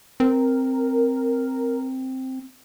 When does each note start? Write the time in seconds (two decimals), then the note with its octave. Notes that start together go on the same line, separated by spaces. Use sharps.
0.20 C4 A#4